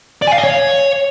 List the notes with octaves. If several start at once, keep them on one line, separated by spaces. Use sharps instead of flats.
D5
G#5
F5
D#5
C#5